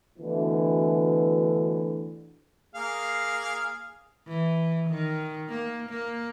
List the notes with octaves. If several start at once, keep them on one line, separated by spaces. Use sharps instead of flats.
D2 B2 D3 E3
A#3 G#4 F5
E3
D#3
A#3
A#3